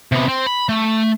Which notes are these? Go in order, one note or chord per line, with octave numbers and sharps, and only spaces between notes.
C3 B3
C4
B5
A3